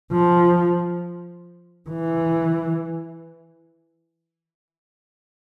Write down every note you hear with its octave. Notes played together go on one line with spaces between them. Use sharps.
F3
E3